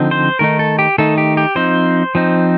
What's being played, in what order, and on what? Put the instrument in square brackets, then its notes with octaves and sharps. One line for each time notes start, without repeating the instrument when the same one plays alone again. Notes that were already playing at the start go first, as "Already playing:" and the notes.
Already playing: [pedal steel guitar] D3 F3 C4 D#4
C5
D#3 A3 D#4 A#4
A4
G4
D#3 A3 D#4 A4
G4
G4
F3 C4 D#4 C5
F3 C4 D#4